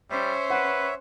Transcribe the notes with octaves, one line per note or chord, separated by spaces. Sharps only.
G3 C#4 C5 C#5 E5
B4 F#5